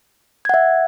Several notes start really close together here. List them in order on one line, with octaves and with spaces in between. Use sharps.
G#6 F#5 E5